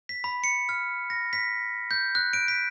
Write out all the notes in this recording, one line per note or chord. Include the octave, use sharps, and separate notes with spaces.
B6
B5
C#7
F6
A#6
B6
G6
F#6
D7
B6